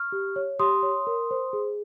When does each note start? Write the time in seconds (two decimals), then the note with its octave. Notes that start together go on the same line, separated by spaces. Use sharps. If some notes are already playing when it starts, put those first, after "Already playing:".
Already playing: C#6 F6
0.12 G4
0.36 C#5
0.59 G4 C6 D#6
0.83 C#5
1.07 A#4
1.31 C5
1.53 G#4